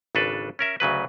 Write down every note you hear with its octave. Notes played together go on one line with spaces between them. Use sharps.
G#1 C#3 D4 A4 B4
C#4 A#4 E5
D2 C#3 F#3 B4